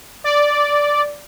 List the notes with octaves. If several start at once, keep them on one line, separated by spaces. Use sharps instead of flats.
D5